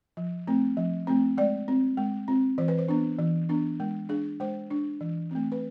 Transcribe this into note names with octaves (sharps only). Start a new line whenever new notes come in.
F3
A3 C4
F3
A3 C4
G#3 D5
C4
G#3
C4
E3 C5
B4
C5
B3 D4
E3
B3 D4
G#3
D4 G#4
G#3 C5
D4
E3
A3 C4
B4